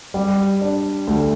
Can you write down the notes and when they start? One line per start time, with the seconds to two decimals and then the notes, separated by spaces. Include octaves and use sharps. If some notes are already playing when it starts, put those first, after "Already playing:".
0.14 G3
0.62 D4
1.07 D2